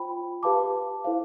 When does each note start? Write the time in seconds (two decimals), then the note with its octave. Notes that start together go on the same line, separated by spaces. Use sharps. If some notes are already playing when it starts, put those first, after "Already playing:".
Already playing: F4 C5 G5 B5
0.43 G4 B4 F5 A5 D6
1.04 E4 A4 C5 F5